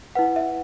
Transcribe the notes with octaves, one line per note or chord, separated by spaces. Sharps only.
E4 B4 F#5
E5